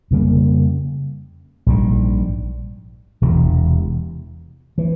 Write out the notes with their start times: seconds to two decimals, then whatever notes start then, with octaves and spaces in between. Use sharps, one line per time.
0.11 F2 C#3 G3 A#3
1.66 A#1 G#2 G3
3.22 E1 E2 C3
4.78 E3